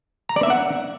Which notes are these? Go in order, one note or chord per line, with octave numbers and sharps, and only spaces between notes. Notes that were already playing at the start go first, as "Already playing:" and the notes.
A#5
D5
E5
F#5